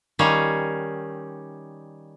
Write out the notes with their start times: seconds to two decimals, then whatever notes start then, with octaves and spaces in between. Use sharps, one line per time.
0.19 D#3 G3 C#4 F5